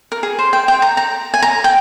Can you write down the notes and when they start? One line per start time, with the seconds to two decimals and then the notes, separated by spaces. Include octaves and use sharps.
0.12 A#4
0.23 G#4
0.39 C5
0.53 G5
0.68 G5
0.82 A#5
0.97 A#5
1.34 G#5
1.42 A#5
1.64 G5